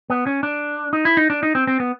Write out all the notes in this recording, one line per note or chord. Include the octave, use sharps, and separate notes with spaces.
B3
C#4
D4
D#4
E4
D#4
D4
D#4
C4
C4
B3